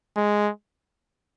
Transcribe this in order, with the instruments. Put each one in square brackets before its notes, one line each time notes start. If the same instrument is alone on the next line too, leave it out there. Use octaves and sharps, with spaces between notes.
[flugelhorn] G#3